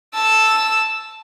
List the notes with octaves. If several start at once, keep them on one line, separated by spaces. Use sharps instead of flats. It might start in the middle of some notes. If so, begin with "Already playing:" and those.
A5 E6